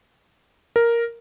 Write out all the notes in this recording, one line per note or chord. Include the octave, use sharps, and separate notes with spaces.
A#4